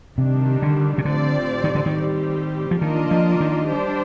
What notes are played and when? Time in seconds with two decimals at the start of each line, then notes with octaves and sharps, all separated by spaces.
0.18 C3 D#3 G3 D4
0.62 D3
0.98 C3
1.05 A2 D3 F3 C4 G4 D5
1.64 D#3
1.75 D3
1.86 D#3
1.93 A2 G3 C4 G4
2.71 F3
2.81 D#3 A#3 D4 F4 A#4 D#5
3.11 F3
3.40 D#3
3.69 G3 D4 G4 C5